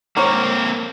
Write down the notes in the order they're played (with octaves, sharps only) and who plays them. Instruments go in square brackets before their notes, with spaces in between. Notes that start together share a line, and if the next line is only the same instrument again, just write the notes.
[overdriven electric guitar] A#3 C4 [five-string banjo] A#4 C5 C#5